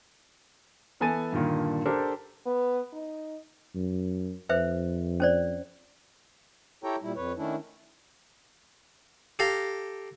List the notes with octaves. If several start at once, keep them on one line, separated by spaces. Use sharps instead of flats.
E3 B3 A4 G#5 A6 D#7
G2 A#2 D3 D#3 A#3
D4 G4 A4 A#4 C5
B3
D#4
F#2
F2 B4 C5 E5
C#4 C5 D5
E4 G4 A4 C#5 G5 A#5
A#2 G3 E4
F2 B4 C#5
D#3 A3 C#4 D4 E4
G4 A4 F5 A#5